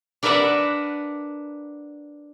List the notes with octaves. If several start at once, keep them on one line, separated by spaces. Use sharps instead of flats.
D4 A#4 B4 D5 E5 F#5